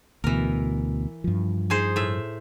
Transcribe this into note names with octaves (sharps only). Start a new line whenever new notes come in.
D2 B2 E3 A#4
G2 F3
D#4 G#4 C5
A2 E5